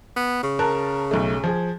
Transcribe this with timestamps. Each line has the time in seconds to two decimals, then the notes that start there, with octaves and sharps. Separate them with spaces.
0.16 B3
0.43 C#3
0.59 A#4 A5 F#6
1.11 B1 A3
1.44 F3 G#4